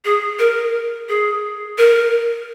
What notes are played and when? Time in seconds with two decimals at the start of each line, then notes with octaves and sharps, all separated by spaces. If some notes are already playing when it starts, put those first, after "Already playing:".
0.05 G#4
0.39 A#4
1.09 G#4
1.78 A#4